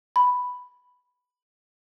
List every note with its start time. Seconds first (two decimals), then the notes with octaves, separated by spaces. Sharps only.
0.16 B5